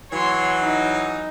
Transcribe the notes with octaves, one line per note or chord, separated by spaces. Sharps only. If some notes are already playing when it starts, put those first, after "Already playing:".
E3 F#3 C#5 C6
D#4